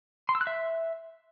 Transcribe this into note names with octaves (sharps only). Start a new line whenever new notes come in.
C6
E6
F#6
E5